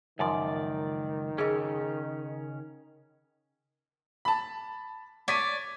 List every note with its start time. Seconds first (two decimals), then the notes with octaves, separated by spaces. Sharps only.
0.19 C#2 F#2 D#3 F3 D5
1.38 C#3 C#4 G#4 A#4 D#5
4.25 A5 B5
5.28 C#5 D5 D6 B6 D#7